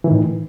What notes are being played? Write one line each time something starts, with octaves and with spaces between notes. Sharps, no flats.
A2 D#3 E3